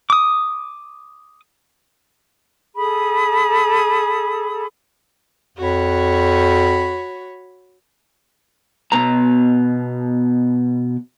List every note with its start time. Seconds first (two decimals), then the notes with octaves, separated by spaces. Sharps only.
0.10 D6 D#6
2.76 G#4 A4 B5 D#6
5.57 F2 F#4 C#5 B5
8.92 B2 B3 A#5